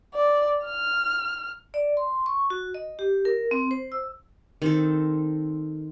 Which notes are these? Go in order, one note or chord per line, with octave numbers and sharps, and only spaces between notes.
D5
F6
D5
C6
C#6
F#4
D#5
G4
A#4
C4
C5
E6
D#3 C4 A4